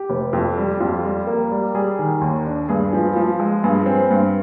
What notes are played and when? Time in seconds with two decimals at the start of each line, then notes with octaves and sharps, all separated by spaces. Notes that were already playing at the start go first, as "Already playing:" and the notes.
Already playing: G4
0.09 F1
0.33 F2
0.58 G3
0.80 F2 F4
1.05 G3
1.27 A#3
1.52 G3
1.75 G3 G#4
1.99 D#3
2.21 D#2
2.46 D4
2.69 G2 G#4
2.93 F3
3.16 F3
3.40 G#3
3.63 G2 G#4
3.86 C4
4.10 G2